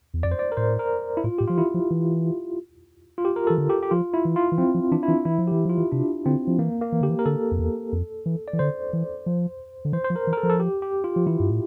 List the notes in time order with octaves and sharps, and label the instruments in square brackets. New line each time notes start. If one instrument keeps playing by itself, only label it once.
[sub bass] E2
[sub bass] F2 [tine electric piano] D5
[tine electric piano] C5
D5
A#4
[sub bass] A2 [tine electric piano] C5
[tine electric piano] A#4
E4
[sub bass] A2 [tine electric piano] F4
[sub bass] A2 [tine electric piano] G4
[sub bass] F3 [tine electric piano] F4
[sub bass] E3 [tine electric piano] E4
[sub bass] F3
E3
[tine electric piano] F4
G4
A#4
[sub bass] E3 [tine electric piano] A4
[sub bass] D3
[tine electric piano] G4
G4
[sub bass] F3 [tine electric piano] F4
[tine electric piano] E4
[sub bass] E3
[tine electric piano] F4
[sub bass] E3
[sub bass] F3 [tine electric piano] C4
[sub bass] F3
[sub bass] E3 [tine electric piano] D4
[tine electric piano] E4
[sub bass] E3
[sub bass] E3 [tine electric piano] E4
[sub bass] F3
[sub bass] E3 [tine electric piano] G4
[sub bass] F3 [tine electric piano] F4
[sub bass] E3
[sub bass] C3 [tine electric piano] D4
[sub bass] D3 [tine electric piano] C4
[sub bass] F3
[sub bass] E3 [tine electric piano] A#3
[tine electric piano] A#3
[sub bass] E3
[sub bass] D3 [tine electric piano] G4
[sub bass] E3
[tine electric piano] A#4
[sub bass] D3 [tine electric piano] A4
[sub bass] F2
E2
F2
E3
[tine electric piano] D5
[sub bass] E3
[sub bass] D3 [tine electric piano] C5
[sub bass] E3
F3
D3
[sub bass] E3 [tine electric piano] C5
[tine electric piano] C5
[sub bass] F3
[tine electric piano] A#4
[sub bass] E3
[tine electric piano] A#4
A4
[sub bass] F3
[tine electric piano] A4
G4
G4
F4
[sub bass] F3
[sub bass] E3 [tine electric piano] E4
[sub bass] G2
A2